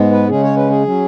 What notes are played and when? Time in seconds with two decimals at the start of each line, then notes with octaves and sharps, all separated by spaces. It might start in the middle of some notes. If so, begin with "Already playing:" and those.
Already playing: G#2 G#3 B3
0.12 B4
0.29 C#3 G#3 C#4 G#4
0.43 C#5
0.57 B4
0.70 G#4
0.85 F#3 C#4